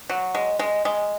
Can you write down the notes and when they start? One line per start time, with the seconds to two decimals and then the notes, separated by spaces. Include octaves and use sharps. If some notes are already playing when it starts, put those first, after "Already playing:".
0.10 F#3
0.35 G#3
0.59 G#3
0.85 G#3